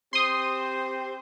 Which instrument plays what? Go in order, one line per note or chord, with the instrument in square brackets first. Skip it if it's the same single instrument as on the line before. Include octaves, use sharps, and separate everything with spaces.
[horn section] C4 G4 C5 [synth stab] C6 D#6